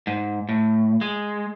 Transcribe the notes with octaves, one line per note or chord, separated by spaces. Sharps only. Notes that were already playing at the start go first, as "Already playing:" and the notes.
G#2
A2
G#3